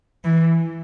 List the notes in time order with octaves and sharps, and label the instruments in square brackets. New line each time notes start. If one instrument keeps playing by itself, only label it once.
[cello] E3